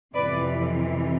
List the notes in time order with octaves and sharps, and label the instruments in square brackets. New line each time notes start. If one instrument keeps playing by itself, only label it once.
[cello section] F2 C3 E3 B4 D5